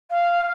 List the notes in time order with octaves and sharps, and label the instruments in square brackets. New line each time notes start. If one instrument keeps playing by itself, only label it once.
[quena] F5